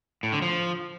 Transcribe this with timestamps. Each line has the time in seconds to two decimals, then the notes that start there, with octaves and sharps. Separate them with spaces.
0.23 A2
0.33 D3
0.42 F3